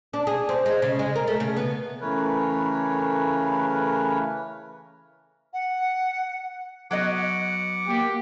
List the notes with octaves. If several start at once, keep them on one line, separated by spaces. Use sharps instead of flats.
D4
G#4
C4
G#3
C#3
G#3
A#4
A3
C#3
B3
C#3 E3 A3 A#4 B4 C#5
F#5
F#3 B3 D#5 F#5 D6
A#3 G4